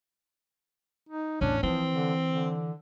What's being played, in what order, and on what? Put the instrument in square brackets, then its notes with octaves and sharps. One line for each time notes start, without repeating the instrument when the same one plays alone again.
[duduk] D#4
[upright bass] A1 E2 [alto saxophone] C#4 [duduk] D4
[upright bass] E3 [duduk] F3 [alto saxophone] C4
[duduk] D3
D3